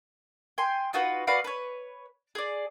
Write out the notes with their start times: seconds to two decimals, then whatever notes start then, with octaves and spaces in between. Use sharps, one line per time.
0.58 G5 G#5 C6
0.93 D#4 F4 F#4 B4
1.27 F#4 B4 D5 F5
1.44 B4 C#5
2.35 G#4 D5